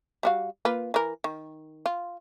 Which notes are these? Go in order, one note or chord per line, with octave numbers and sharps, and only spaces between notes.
G3 F#4 F5
A#3 F4 B4
E3 A#4
D#3
F4